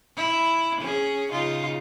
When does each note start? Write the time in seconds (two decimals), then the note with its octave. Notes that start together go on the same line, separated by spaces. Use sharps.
0.17 E4
0.81 C#4 G#4
1.32 C#3 D#4 F4